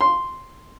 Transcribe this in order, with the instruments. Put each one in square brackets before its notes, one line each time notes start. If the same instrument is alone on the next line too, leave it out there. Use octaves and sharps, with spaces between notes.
[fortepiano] C6